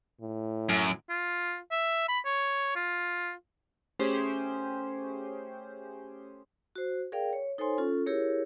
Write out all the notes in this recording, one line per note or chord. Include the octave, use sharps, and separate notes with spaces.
A2
F#2
F4
E5
B5
C#5
F4
A3 C#4 G4 G#4 C5
F#4 C5
G#4 A#4 D5 F5 G5
C#5
D#4 A4 C5 C#5 G#5 C6
C#4 F4 A4
E4 G4 G#4 A#4 C#5